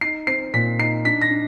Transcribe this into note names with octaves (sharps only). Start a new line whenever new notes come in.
D#4 C7
C4 C7
A#2 B6
D#4 C7
D4 B6
A#6
D4